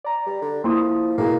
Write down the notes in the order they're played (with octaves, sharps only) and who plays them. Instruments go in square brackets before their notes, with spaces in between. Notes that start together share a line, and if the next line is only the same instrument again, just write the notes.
[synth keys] D5 A#5
[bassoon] G3
D3
[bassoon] F3 [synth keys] A#3 E4 [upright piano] C6 D#6
[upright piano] B2 E4 G#4 [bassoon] A#3